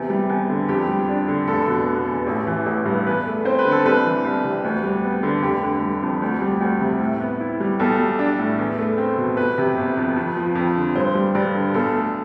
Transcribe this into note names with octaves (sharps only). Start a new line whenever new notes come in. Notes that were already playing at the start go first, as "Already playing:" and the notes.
Already playing: E2 C3
G3
E2
D3
F2 G4
G3
D4
D3
F1 A4
B2
B3
E2
A1
E3
A1
G2
E2 B4
A3
C4 C5
B4
D3
A4
C2 B4
E3
C2
C3
D2
G3
B3
D3
F1 G4
D3
G3
F2
D2
G3
D2
C3
A2
B3
E4
G3
B1 A4
G3
D4
A2
E2
A3
C4
B2
G1 B4
C3
G1
F2
F2
F3
F2
D3
G2 C5
G3
G2 D5
D3
B1 A4
A3